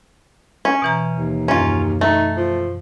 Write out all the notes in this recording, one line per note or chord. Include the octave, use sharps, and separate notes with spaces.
C#4
B2 E3 A#5
D#2
F#2 C#4 F4
A3 D#4
F3